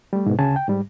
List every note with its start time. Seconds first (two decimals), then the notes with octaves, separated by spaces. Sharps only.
0.13 G3 A3
0.26 G#2 B2
0.39 D2 C#3 G#5 A5
0.56 G5
0.68 G#2 G3